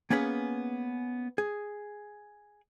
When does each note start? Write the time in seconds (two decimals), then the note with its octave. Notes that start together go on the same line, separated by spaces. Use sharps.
0.10 A#3 B3 C#4 G#4 B4
1.38 G#4